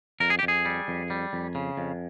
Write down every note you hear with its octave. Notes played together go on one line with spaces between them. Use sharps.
F2 A#4
G#4
G4
F2
G#4
G3
F2
G3
F2
C#3
F2